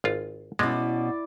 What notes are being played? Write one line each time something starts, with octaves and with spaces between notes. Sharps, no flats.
G#1 F4
B2 G#3 C#4 E4 D5